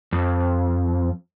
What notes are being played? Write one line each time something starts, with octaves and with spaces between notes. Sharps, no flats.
F2